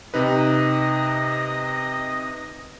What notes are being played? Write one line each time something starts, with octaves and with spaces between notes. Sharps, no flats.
C3 D#4 B4 D#5